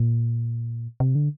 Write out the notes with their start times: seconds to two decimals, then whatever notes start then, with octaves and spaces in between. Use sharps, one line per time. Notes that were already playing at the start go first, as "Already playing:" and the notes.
Already playing: A#2
1.00 C3
1.15 D3